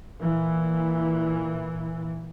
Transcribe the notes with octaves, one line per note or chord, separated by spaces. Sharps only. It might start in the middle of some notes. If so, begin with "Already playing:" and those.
A#2 E3